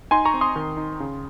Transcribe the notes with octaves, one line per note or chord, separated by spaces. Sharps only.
D#4 G#5 C6
A#5 C#6
C4
C6 D#6
D#3
D#4
C#3